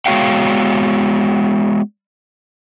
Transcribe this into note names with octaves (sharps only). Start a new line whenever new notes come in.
G#3 B3 F#4 C#5 F5 G5